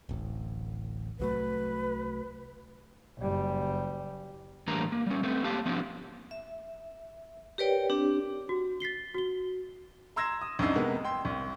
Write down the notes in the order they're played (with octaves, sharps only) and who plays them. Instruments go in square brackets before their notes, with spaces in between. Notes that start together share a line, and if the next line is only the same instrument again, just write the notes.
[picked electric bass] D1 A1
[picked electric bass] C2 F#3 A3 [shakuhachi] B4
[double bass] F#1 G3
[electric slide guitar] A2 E3 G3 A#3 D4 A#5
A#3
G3 C#4
A3 B3 C4
A#3 G4 F5 A5
F3 B3 C4 D4
[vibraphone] E5
G4 A#4 B4 C#5 D5 G5
C4 D4 G4
[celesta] F#4
A6 B6 C7 G7
F#4 G7
[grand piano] A#5 C6 E6 G#6 A#6 E7
D#6
C2 F#2 D4 D#4 E6 C7
C3 G#3 A#3 B3
G5 C6
C2